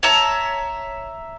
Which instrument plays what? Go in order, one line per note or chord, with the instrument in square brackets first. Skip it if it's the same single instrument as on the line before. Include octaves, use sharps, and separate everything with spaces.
[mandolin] C#5 E5 A5 A#5